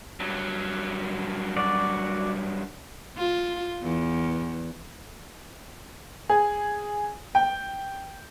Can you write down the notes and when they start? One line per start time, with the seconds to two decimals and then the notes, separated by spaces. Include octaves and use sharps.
0.20 G2 F#3
1.57 F#4 D5
3.17 F4
3.83 E2
6.30 G#4
7.35 G5